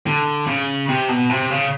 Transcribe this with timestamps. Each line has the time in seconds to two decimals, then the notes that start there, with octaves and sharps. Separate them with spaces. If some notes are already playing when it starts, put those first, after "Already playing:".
0.06 D3
0.47 C#3
0.89 C3
1.09 B2
1.29 C3
1.51 C#3